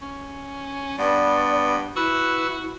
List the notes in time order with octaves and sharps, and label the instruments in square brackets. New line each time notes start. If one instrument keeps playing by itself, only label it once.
[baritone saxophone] C#4
[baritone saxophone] G2 [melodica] B3 [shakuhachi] D5
[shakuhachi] E4 [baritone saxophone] F#4 [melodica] B4 E6